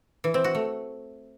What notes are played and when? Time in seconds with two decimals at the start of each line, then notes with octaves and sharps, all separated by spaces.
0.24 E3
0.34 C4
0.44 F#4
0.55 A3